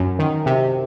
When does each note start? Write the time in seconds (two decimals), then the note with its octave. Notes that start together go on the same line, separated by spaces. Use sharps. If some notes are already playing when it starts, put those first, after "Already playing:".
Already playing: F#2
0.19 D#3
0.46 C3